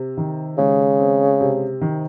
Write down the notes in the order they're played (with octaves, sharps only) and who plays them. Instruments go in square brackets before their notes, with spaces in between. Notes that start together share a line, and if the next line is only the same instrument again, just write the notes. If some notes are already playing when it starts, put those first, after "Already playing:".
Already playing: [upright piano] C3
D#3
[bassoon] C#3 [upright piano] G#3
[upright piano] C4
C3
D#3